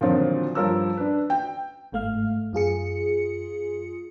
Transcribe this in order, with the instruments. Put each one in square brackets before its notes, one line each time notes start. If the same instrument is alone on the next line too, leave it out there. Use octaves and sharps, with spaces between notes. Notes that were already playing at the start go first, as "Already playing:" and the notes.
[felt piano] A#2 D3 D#3 F3 F#3 C4
G2 F3 A#4 C#5 E6
D4 B4
G5
[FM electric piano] G1 G#2 A3 F5 F6
F#2 F4 G#4 C#7